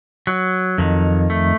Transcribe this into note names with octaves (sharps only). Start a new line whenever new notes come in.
F#3
F2 D#3
A3